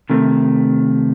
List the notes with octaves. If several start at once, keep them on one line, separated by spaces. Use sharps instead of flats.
C3 D#3 A3